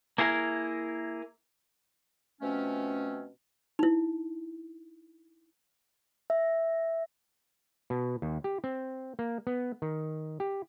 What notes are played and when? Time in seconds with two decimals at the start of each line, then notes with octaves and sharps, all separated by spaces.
0.18 A#3 E4 G#4 A#4
2.41 B2 F3 A3 C4 C#4
3.79 D#4 E4
6.30 E5
7.90 B2
8.22 D#2
8.44 G4
8.64 C4
9.19 A#3
9.47 B3
9.82 D#3
10.40 G4